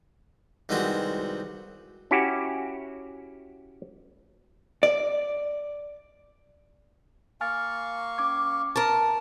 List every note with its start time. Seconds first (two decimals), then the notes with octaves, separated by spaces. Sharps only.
0.69 C2 D#3 G#3 B3 C4 F#4
2.11 C#4 E4 F#4 G4
4.83 D5
7.41 A#3 F5 G#5 C#6 F6 A6
8.18 C#4 D6 G#6
8.76 A#4 A5 C#6